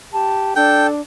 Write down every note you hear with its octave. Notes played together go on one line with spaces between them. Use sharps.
G4 A5
D4 A4 G5